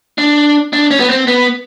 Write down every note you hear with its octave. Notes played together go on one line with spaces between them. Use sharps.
D4
D4
C#4
B3
C4
B3